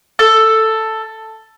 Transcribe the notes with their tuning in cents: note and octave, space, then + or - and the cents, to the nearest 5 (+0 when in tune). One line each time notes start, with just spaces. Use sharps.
A4 +5